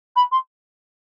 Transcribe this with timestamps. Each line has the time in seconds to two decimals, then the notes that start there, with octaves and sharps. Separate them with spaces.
0.16 B5
0.32 C6